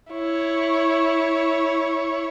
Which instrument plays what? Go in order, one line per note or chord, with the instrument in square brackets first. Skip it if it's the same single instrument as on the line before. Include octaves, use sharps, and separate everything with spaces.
[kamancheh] E4 C#5